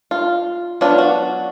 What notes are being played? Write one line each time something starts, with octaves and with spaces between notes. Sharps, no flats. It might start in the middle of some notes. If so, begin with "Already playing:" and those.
F4
F#3 B3 D4 F4
F#4